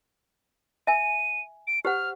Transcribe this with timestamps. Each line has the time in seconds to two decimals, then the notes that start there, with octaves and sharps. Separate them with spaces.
0.87 E5 G#5 D#7
1.67 D7
1.85 G4 C5 F#5 F6